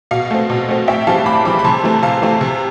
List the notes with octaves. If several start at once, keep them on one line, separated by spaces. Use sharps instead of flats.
B2 F5
A3 C4
B2
A3 C4
A2 E5 G5
E3 G3 C4 F5 A5
A2 B5 D6
E3 G3 C4 B5 D6
B5
C3 A5 C6
E3 A3 C4
C3 F5 A5
E3 A3 C4
C3